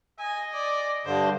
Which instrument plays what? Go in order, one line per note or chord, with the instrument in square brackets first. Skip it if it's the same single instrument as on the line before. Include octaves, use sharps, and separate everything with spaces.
[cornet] D#5 [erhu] G#5
[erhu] D5
[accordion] G2 D3 [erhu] C5